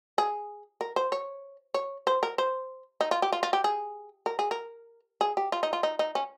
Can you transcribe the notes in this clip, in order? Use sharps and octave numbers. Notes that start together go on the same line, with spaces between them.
G#4
A#4
C5
C#5
C#5
C5
A#4
C5
D#4
F4
G4
F4
F4
G4
G#4
A#4
G#4
A#4
G#4
G4
F4
D#4
F4
D#4
D#4
C#4